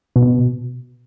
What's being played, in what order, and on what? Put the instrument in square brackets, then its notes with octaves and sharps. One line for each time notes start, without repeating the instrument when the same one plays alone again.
[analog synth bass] B2